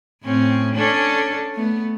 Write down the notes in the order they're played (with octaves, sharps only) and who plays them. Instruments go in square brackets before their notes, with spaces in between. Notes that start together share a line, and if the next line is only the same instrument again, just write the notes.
[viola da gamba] A2 C4 C#4
C#4 D4 A4
A3 B3